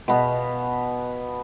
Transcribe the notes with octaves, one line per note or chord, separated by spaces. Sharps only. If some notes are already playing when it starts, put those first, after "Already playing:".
B2 B3 F5